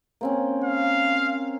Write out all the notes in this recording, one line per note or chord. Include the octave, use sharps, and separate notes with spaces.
A#3 C4 C#4
F5